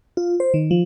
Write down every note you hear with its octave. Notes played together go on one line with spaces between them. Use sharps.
F4
C5
D#3
F3